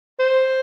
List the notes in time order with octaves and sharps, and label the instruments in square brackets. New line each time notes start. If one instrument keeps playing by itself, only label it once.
[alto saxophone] C5